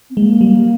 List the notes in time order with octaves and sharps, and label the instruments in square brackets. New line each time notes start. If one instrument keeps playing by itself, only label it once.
[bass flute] C4
[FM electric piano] G#3 [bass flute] A#3
[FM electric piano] G3